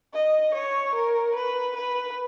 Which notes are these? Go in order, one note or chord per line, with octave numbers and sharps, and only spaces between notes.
D#5
C#5
A#4
B4
B4